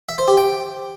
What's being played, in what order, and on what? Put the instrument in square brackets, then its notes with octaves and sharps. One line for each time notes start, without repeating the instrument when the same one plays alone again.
[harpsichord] E5
C5
G4
G5